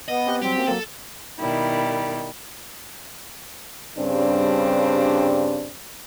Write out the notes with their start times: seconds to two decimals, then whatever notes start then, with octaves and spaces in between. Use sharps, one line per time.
0.08 B3 D#5
0.27 C4 G4 F#6
0.42 F#3 G3 C4 G4
0.56 A#3 C#4 F#4
0.68 F#3 A#3 A4
1.39 B2 D#3 G3 E4
3.97 G2 C#3 G3 C4 D4